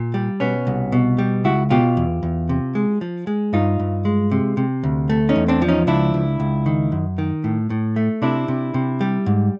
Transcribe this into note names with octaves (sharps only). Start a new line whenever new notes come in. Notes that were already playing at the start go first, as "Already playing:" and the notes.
Already playing: A#2
G3
B2 B3 C#4
C2
B2
G3
C#2 E4 F#4
B2 F4 G4
E2
E2
C3
G#3
F3
G#3
G2 D#4 F4
G2
G#3
C3
C3
D2
A3
C#4 D#4
E2
C4 D4
F3
C#4 D#4
C#2 D4 E4
C#2
C#2
D#3
F#2
D#3
A2
A2
A3
C3 D4 E4
C3
C3
G3
G#2